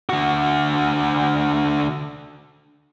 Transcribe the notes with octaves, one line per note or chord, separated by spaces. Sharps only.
D3 F#4